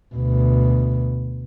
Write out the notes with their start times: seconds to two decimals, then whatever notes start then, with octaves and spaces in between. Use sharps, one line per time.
0.15 D2 B2